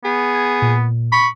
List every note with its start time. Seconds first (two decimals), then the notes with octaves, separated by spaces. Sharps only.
0.05 B3 G#4
0.35 G#6
0.62 A#2
1.12 B5 C#6